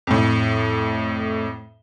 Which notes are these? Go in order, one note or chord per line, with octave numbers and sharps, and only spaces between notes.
F2 A2